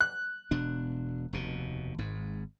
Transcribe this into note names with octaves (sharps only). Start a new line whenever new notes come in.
F#6
E1 B2 D4
F1 D#2 B2
G#1 G#2